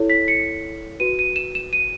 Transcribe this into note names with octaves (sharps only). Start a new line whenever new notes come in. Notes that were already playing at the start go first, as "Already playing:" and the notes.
Already playing: E4 A4 C#5
B6
C#7
F#4 B4 D#7
D#7
E7
E7
D#7